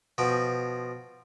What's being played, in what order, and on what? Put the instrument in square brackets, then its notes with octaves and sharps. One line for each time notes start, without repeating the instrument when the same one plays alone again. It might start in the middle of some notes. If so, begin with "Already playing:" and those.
[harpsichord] B2 F3 G5